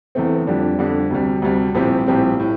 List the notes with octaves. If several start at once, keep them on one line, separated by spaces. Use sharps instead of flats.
E2 E3 A3 C4
F2 D3 G3 D4
F2 D3 G3 D4
D2 C3 G3
D2 C3 G3
A#1 A2 G3 C4 G4
A#1 A2 G3 C4 G4
A2